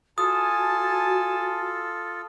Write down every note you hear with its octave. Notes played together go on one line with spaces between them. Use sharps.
F4 F#4 A4 G#5 A5 D#6